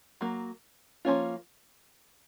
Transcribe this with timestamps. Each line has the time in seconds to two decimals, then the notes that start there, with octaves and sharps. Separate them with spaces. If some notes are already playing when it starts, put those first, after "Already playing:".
0.21 F#3 A#3
1.05 F3 A#3 C#4 F4